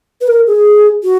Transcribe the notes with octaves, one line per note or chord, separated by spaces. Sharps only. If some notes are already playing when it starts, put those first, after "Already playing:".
B4
A#4
G#4
F#4